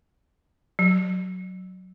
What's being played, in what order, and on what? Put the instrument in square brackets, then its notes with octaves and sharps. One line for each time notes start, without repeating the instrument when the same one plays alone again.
[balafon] F#3